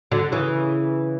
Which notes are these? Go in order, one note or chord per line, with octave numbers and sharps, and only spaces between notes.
D3 F#3
C#3 E3